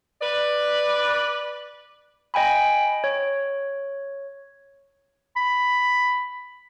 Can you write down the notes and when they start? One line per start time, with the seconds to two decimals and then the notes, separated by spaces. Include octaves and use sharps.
0.21 B4 D5
2.34 D#5 G5 G#5 B5
3.04 C#5
5.36 B5